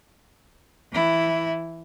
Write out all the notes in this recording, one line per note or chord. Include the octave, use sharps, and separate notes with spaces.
E3 E4